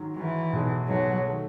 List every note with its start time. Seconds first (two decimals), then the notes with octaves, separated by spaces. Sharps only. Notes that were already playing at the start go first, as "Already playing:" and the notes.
Already playing: G#2 D#3 F#3
0.17 G#2 D#3 E3 F#3
0.53 B1 B2 G#3 D#4 G#4
0.89 B1 B2 F#3 G#3 D#4 G#4
1.25 D#3 A3